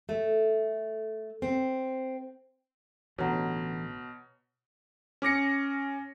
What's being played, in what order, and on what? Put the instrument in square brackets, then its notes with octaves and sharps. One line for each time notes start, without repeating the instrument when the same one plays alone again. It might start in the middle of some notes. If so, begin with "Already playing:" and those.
[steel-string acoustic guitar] A3
C4
[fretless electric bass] A1 D3 [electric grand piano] B2 [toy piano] C#5 F#5 A#5
[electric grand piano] C#4 D6 A#6 C#7